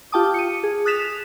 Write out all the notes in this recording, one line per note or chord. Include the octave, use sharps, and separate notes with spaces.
F4 G4 G5 A5 D6 D#6
C#7 D#7
G#4
D#6 F#6 A6 B6 E7 F7